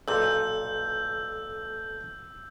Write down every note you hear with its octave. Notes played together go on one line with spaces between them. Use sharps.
B1 A#2 A4 E6 G6